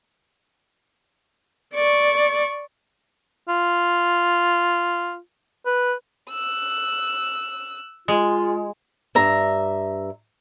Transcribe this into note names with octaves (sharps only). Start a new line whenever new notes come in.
D5 C#6
F4
B4
E6 F#6
G#3 F4
G2 E5 A#5